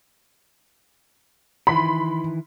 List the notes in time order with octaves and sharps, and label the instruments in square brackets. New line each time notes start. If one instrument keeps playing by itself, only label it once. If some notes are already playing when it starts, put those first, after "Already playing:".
[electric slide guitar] D#3 E3 E4 [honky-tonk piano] B5 C6 B6